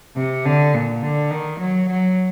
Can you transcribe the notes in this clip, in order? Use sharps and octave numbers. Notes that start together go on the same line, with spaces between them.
C3
D3
A#2
D3
D#3
F#3
F#3